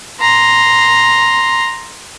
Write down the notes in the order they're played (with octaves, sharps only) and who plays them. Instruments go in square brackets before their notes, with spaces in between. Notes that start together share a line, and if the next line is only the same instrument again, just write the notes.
[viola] A#5 C6